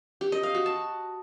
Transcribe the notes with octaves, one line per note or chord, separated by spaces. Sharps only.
G4
D#5
F5
F#4
A5